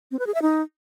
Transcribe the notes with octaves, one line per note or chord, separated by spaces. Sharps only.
C4
B4
G#4
E5
D#4